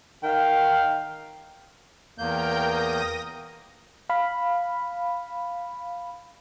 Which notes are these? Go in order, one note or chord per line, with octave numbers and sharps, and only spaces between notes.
D#3 F5 G5
E2 A#3 A#4 G5 G6
D#6 A#6
F5 B5